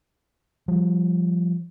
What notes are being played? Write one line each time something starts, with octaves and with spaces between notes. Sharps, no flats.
F3 G3